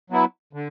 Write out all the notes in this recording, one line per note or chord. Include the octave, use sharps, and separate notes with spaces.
F#3 B3 E4
D3